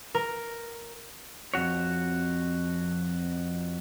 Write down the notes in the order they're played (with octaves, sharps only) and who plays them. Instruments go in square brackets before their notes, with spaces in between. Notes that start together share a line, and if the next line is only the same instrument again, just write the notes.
[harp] A#4
[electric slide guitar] F2 C3 F#4 C#5